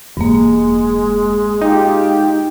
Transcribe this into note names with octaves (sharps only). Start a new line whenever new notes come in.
E1 G2 G#3 A#3
D#4 F4 G4 G5